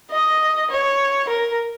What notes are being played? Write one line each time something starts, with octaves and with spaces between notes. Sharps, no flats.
D#5
C#5
A#4